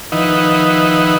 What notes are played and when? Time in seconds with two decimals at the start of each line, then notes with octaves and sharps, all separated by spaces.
0.12 D#3 F3 D#4 E4 B4 F#5